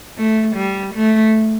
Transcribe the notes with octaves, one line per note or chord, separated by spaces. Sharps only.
A3
G3
A3